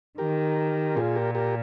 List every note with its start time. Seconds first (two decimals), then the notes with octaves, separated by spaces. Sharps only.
0.18 D#3 G4 A#4
0.97 A#2 F4 G#4
1.16 G4 A#4
1.35 G4 A#4